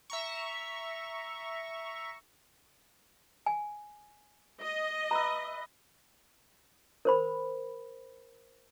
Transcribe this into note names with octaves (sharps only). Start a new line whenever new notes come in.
E5 A#5 C#6
G#5
D#5
B4 E5 A#5
A#4 C5 B5